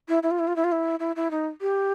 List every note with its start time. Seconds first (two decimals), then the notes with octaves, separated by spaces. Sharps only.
0.09 E4
0.23 E4
0.31 F4
0.39 E4
0.47 F4
0.56 E4
0.64 F4
0.72 E4
1.00 E4
1.16 E4
1.31 D#4
1.61 G4